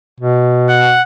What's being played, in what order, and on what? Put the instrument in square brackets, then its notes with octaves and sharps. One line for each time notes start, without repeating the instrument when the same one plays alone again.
[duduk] B2
[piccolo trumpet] F#5